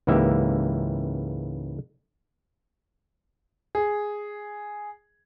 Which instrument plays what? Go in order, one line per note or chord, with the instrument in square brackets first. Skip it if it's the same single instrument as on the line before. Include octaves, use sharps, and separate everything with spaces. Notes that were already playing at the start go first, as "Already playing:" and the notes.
[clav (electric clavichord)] C#2 G#2 E3 A#3 G4 E5
[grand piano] G#4